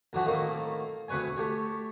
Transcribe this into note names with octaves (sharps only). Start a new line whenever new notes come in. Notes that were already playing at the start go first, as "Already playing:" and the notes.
D2 E3 D4 F#4 E5
A2 D#3 A3 A#3 C4
D2 C3 B4 C#5 G#5
A3 G4 C#5